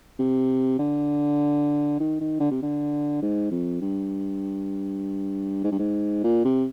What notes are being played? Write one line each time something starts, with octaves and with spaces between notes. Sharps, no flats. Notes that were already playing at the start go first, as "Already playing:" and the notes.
C3
D3
D#3
D#3
D3
C3
D3
G#2
F2
G2
G#2
G2
G#2
A#2
C3